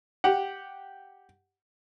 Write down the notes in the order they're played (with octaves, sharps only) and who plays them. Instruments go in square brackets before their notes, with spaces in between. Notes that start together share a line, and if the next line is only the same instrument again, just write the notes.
[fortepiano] G4 F#5